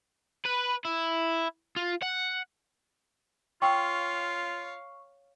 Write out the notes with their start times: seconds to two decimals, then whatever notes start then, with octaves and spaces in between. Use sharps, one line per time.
0.45 B4
0.85 E4
1.76 F4
2.03 F#5
3.62 F4 C#5 F5 G5 C6 C#6 E6